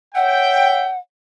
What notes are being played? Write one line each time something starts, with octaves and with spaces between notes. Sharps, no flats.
C#5 E5 F#5 G5